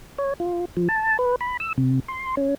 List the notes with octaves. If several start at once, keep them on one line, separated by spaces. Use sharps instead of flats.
C#5
F4
F3
A5
B4
B5
E6
C3
C6
C#4